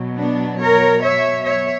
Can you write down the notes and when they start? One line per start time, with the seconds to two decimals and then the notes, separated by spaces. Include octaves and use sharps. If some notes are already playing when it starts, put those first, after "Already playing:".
Already playing: B2 F#3
0.17 B3 D4
0.60 A#4 C#5
1.02 C#5 E5
1.44 C#5 E5